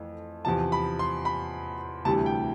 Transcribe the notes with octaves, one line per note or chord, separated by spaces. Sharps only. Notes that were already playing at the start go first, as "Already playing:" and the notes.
Already playing: F2 E3 A3
E2 C3 F3 A5
B5
C6
B5
D2 C3 E3 G3 A5
G5